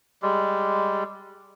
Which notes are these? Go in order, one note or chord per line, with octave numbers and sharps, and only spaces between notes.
G3 G#3